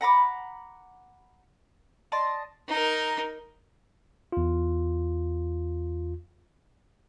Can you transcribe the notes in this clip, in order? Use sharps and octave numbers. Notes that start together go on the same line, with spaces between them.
F#5 A#5 B5 D6
D5 D#5 A5 C6
D#4 A#4
E2 F4